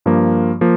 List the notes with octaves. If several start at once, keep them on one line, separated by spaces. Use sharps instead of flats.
G2 F3 A#3
F3 A#3